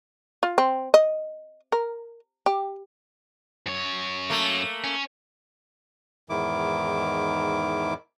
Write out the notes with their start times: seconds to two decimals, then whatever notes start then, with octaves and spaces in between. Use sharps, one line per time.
0.43 F4
0.58 C4
0.94 D#5
1.72 A#4
2.46 G4
3.66 F#2 C#5
4.30 A3 A#3
4.84 C#4
6.30 E2 G#2 D#3 E4 D6